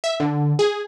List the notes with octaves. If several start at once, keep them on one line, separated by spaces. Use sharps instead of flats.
E5
D3
G#4